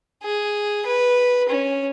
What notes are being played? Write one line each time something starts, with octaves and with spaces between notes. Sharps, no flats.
G#4
B4
C#4